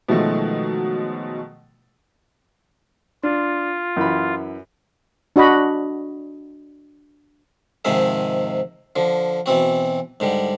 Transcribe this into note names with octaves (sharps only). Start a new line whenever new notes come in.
B2 D#3 F3 F#3 G#3 A3
D4 F4
F#2 E3 B5
D4 F#4 D#5 B5
G#2 C3 D#3 F3 G#4 E5
D3 F3
B2 E3 C4 F#4
G#2 D3 G3